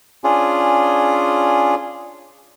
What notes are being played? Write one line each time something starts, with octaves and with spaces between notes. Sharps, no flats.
C#4 D4 F4 G#4